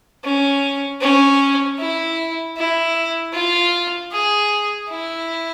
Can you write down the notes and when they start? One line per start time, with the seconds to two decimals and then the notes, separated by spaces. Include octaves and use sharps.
0.24 C#4
1.01 C#4
1.78 E4
2.57 E4
3.34 F4
4.12 G#4
4.90 E4